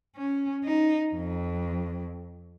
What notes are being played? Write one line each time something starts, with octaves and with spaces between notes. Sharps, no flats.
C#4
D#4
F2